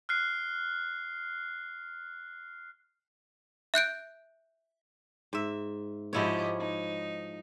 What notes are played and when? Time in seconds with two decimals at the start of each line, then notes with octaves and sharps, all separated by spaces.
0.09 F6 F#6 C7
3.74 E5 F#6 G6 D7
5.33 G#2 E5
6.13 G#2 F3 E4 G4 C#5 D#5
6.59 D#4